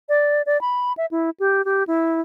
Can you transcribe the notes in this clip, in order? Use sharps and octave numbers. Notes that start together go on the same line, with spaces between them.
D5
D5
B5
E5
E4
G4
G4
E4